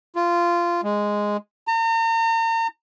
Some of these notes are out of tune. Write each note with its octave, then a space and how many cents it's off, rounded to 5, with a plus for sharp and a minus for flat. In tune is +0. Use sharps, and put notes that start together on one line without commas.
F4 -15
G#3 -5
A#5 -40